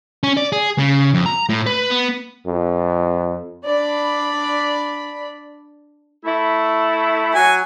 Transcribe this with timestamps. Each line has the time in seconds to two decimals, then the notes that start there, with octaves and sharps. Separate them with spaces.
0.23 C#4
0.37 D5
0.52 G#4
0.78 C#3
1.14 F2
1.26 A#5
1.49 A2
1.66 B4
1.90 B3
2.46 F2
3.67 D4 D5 B5
6.25 A3 E4
7.35 F#3 G#5